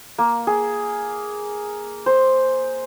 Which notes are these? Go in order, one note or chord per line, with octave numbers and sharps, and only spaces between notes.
A#3
G#4
C5